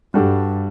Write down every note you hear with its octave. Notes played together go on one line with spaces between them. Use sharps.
G2 G3 D4 F#4 A4